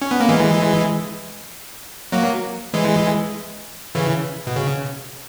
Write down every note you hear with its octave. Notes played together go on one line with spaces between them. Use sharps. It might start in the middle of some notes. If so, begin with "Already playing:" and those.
C#4
B3
A#3
E3 G#3
F#3 A#3
E3 G#3
C#3 E3
B2
C#3